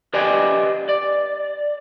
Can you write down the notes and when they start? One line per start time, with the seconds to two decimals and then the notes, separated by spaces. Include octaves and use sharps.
0.14 G4 B4 D5 D#5 G5 G#5
0.89 D5